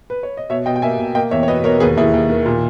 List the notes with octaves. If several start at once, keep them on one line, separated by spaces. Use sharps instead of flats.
B4
C#5
D#5
B2 C#5 E5
B2 D#5 G5
G5
A#3 E5 G#5
B2
A#3 D#5 G5
E2 C#5 E5
C#5
B2 B4 D#5
B2 A#4 C#5
D#2 G#4 B4
D#2 E4 G#4
D#2
D#3
A#2